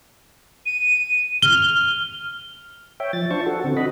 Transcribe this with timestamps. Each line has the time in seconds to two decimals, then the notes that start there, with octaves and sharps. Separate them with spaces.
0.66 D#7
1.42 F6 G7
3.00 C#5 E5 G5
3.13 F3 A6
3.31 D4 F4 C5 A5 C#6
3.46 F#4 A4
3.64 D3 C4
3.77 F#4 D#5 B5